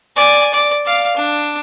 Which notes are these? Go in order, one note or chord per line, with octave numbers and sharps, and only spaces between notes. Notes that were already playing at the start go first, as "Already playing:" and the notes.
D5 G#5
D5
D5 F5
D4